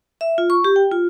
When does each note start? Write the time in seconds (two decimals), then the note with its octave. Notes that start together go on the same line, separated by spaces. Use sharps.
0.21 E5
0.38 F4
0.50 C#6
0.64 G4
0.76 G5
0.92 F4